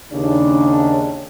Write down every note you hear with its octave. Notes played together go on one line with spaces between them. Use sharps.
D#2 C#3 D4